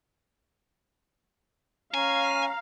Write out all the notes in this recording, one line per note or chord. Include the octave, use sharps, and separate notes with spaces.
C#4 F5 G#5 A#5